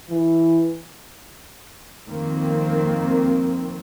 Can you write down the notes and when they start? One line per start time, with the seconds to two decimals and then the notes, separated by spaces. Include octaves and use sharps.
0.10 E3
2.07 F2 D#3 A#3 C4